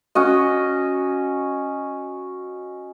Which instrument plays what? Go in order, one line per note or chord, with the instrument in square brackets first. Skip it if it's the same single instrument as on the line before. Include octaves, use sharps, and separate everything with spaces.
[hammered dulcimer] C#4 F#4 D#5